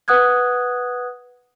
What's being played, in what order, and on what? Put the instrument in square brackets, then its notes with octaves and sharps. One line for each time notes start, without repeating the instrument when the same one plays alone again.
[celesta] B4 F#5 D#6 F#6 G#6